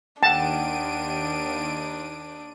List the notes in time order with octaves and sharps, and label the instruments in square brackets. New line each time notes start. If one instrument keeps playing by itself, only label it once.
[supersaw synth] D#2 D7 D#7 [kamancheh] D4 [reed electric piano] F#5 G5 [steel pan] A5